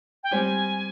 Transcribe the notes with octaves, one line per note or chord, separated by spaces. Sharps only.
G5
G3 C4 G4 G#5